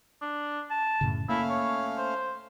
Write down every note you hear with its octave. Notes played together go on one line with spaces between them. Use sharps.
D4
A5
F#2 A2 C#3
A3 A#3 C#4 E4 F5
C#5
C5